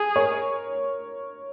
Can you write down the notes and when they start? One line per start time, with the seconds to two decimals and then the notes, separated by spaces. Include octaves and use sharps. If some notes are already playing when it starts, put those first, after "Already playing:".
Already playing: G#4
0.16 A#4 C#5